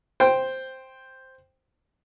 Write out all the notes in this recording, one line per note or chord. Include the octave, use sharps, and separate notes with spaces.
C5 G5